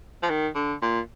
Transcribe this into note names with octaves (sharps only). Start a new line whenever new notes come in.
F3
D#3
D3
A#2